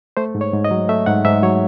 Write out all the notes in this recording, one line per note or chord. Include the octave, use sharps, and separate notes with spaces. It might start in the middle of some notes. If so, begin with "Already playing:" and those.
A3 C5
G#2
C#5
G#2
D#5
F#3
A3 E5
G#2 F#5
G#2 E5
F#3 C#5